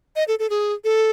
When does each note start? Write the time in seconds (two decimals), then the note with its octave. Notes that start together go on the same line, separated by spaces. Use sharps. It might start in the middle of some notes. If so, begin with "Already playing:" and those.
0.16 D#5
0.28 A4
0.39 A4
0.50 G#4
0.84 A4